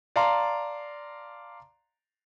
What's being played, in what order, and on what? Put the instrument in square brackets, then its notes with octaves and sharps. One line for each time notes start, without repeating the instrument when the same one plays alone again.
[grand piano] D5 F5 A5 A#5 C6